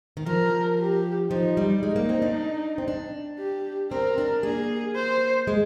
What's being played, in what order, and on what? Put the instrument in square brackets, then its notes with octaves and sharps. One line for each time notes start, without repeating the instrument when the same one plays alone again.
[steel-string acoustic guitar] D#3
[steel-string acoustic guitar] F3 [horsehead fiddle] A#4
[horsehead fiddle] G4
[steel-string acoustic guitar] F3 [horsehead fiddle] D#4
[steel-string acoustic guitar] G3
[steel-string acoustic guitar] G#3 [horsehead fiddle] D#4
[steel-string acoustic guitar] A#3
C4
D4
C4
D4
[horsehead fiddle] G4
[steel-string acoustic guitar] C4 [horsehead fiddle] A#4
[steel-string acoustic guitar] D4
[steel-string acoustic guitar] A#3 [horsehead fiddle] G#4
[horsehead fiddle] C5
[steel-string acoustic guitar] G#3